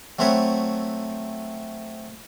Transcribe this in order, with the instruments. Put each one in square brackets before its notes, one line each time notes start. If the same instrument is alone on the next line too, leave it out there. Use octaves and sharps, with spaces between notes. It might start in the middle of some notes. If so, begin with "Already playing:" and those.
[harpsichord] F#3 A3 C4 B4 C#5 E5